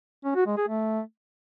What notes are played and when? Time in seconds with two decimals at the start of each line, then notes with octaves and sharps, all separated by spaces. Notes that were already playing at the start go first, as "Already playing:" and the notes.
0.25 C#4
0.35 F#4
0.46 G#3
0.57 G#4
0.68 A3